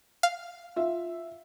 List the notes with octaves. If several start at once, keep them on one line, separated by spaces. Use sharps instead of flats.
F5
F4 E5